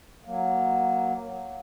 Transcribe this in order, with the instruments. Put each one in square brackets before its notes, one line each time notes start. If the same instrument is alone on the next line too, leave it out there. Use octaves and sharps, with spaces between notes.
[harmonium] F#3 A#3